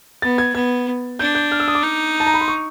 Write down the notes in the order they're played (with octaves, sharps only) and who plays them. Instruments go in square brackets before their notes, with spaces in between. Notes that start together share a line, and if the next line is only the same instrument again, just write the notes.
[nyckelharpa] B3 [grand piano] A6
[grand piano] G#6
[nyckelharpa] B3 [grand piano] G#6
[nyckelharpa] D4 [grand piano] G6
[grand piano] G6
F6
E6
D#6
D6
[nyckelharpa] D#4
[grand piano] A5
A#5
B5
C6
C#6